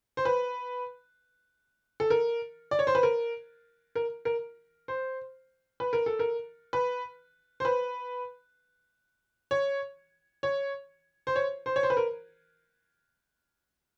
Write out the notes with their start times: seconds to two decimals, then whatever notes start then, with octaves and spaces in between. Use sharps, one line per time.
0.17 C5
0.25 B4
2.00 A4
2.10 A#4
2.71 D5
2.79 C#5
2.87 C5
2.95 B4
3.03 A#4
3.95 A#4
4.25 A#4
4.88 C5
5.80 B4
5.93 A#4
6.06 A4
6.19 A#4
6.73 B4
7.60 C5
7.65 B4
9.51 C#5
10.43 C#5
11.27 C5
11.36 C#5
11.66 C5
11.76 C#5
11.83 C5
11.90 B4
11.97 A#4